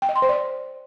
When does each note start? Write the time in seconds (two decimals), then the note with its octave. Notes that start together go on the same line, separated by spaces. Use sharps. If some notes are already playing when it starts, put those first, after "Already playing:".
0.02 G5
0.09 D#5
0.16 C6
0.22 C5
0.29 D5